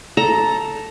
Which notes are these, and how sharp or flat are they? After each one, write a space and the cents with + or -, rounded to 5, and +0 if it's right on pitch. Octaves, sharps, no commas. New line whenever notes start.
A4 +0 A#5 +10